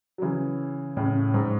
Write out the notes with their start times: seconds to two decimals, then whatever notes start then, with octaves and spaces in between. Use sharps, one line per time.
0.18 F#3
0.22 C#3 E3
0.97 A2 C#3
1.34 G#2